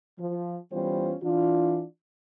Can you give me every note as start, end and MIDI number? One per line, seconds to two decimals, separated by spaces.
0.19 0.58 53
0.73 1.15 52
0.73 1.15 55
0.73 1.15 59
0.73 1.15 61
0.73 1.15 65
0.73 1.15 72
1.23 1.85 52
1.23 1.85 62
1.23 1.85 65